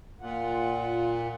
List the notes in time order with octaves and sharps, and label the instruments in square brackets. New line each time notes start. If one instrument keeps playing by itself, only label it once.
[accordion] A#2 [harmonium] F4 F#5